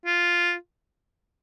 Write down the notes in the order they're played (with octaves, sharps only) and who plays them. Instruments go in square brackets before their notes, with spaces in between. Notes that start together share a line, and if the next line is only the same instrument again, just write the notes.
[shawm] F4